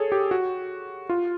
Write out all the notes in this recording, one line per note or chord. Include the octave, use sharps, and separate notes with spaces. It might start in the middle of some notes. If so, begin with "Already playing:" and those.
Already playing: G#4 A4 C#5
G4
F#4
F4